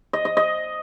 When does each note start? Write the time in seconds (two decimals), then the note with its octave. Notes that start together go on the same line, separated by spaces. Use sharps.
0.13 D#5
0.25 D#5
0.37 D#5